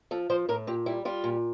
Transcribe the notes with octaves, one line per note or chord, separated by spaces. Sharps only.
F3 A4
F3 C5
A2 A#4
A#2 G4
G3 E4
G3 F4
A#2